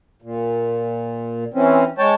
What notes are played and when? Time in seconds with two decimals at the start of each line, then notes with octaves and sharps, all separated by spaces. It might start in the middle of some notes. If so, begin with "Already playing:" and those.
0.22 A#2
1.54 E3 C4 C#4
1.98 G#3 C#5 G5 A5